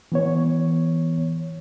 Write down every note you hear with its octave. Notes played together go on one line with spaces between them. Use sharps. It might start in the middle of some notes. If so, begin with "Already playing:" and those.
E3 B3 C#5